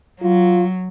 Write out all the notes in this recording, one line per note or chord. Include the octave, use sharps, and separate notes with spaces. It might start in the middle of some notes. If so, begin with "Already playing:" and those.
F#3 F4